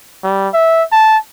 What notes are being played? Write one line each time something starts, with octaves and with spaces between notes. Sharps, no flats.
G3
E5
A5